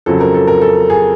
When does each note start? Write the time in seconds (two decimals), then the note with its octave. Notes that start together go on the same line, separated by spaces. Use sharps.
0.06 F2 C#3 F#3 A4
0.21 A#4
0.34 A4
0.47 A#4
0.62 A4
0.90 G#4